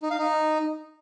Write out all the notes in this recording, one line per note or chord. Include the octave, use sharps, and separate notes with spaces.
D#4
F5
D#4